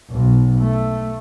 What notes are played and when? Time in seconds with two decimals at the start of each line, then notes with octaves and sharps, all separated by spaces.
0.11 B1
0.60 A3